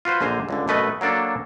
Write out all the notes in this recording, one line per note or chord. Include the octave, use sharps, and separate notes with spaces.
F4 F#4 B4 C5
A#1 D3 C5 G#5 A#5
C#2 G2 D3
F#2 B2 A3 B4 D#5
F#3 A#3 D4 A4